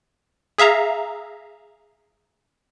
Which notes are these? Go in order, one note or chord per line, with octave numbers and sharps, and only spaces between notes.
G#4 E5 F5 A#5